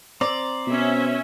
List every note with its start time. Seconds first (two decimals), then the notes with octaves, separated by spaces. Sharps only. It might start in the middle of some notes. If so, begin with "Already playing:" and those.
0.21 C4 C5 D5 A#5
0.67 B2 C#4 E5